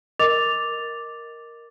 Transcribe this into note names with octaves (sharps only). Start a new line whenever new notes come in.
A#4 D#5 D6 A6 F7